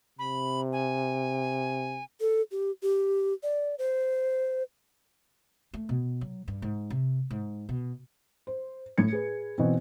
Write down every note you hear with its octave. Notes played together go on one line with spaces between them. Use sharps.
C3 B5
G#5
A4
G4
G4
D5
C5
A3
B2
F#3
G2
G#2
C3
G#2
B2
C5
A2 G#6 C#7
G#4 B4
B2 E3 C4